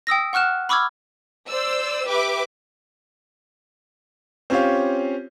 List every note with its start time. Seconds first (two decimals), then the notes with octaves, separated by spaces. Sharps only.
0.07 G5 D#6 E6 A#6
0.33 F#5 C#6 F6 F#6 E7
0.69 B5 C#6 D6 E6 F6 G#6
1.49 C5 D5 E6
2.06 G4 B4 E5 D6
4.50 C4 C#4 F4 G4 C#5 F5